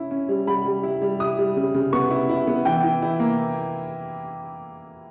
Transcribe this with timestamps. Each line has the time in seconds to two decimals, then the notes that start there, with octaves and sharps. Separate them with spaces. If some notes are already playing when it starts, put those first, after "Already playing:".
Already playing: C#4 E4
0.11 C#4
0.29 G3
0.47 G3 B5
0.65 G3
0.83 E4
1.02 G3
1.20 E4 D#6
1.39 G3
1.57 C#3
1.74 C#3
1.93 B3 C#6
2.11 E4
2.29 E4
2.47 B3
2.65 E3 G5
2.83 E3
3.02 E4
3.20 A#3